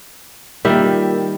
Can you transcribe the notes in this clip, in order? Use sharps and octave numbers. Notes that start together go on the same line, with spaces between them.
D#3 G3 A#3 F4 A#4 E5